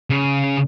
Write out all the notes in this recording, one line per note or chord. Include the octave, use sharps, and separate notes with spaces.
C#3